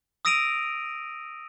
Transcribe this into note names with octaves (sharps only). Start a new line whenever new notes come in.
D#6 E6 A#6 D7 D#7 F7